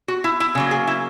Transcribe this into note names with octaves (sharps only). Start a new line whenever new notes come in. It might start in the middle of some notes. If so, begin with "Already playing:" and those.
F#4
E4
E4
C#3 F#3 A#3
G#4
E4